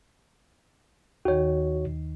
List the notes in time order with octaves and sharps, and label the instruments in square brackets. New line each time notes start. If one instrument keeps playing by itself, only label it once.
[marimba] D#2 D#3 [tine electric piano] F#4 C#5